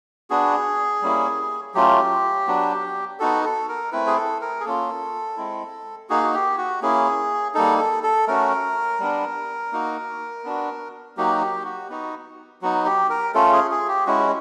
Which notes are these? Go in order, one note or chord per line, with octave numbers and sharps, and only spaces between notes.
B3 D4 F#4 G#4
G3 A#3 C#4 E4
F#3 A3 C#4 F4 G4
F#3 B3 D4 F#4
B3 D#4 F#4 A4
A4
A#4
A3 C4 E4 B4
G#4
A4
A#4
G#4
A#3 C#4 F4 A4
G#3 C4 E4
A#3 D#4 F#4 G#4
F#4
G4
F#4
A#3 C#4 E4 G#4
G3 A#3 D#4 A4
A4
A4
A3 C#4 F#4 A#4
G3 B3 D4
A#3 D#4 F#4
B3 D4 F#4
F#3 A#3 D#4 F#4 G4
G4
F#4
B3 D#4 F#4
F#3 B3 D#4 F#4
G4
A#4
A3 C#4 F4 A4
G#4
G#4
G4
G#3 C#4 E4 F#4